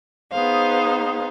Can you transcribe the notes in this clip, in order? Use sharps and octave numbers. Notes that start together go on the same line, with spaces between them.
B3 D#4 G#4 C5 F5